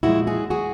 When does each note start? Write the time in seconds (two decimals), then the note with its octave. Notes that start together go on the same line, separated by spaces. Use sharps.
0.03 A#2 F3 G#3 E4 F#4
0.27 F#4 G#4
0.50 F#4 G#4